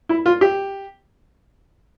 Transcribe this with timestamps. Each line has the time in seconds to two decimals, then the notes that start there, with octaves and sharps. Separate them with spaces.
0.09 E4
0.26 F4
0.41 G4